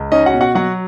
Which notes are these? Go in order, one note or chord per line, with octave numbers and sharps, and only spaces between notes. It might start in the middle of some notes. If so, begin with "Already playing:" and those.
Already playing: C#2
C#4 D#4 D#5
F#4 F#5
B2
F#4 F#5
F#3 F#4 F#5